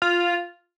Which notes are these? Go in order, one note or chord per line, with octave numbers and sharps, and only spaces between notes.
F4